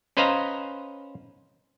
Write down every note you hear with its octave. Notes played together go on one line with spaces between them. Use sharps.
C#4 B4 C5 D#5 F5 A#5